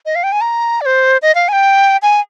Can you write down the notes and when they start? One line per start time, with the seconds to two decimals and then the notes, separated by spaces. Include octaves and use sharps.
0.06 D#5
0.15 F5
0.23 G5
0.32 G#5
0.41 A#5
0.81 D5
0.86 C5
1.22 D#5
1.35 F5
1.48 G#5
1.53 G5
2.02 G#5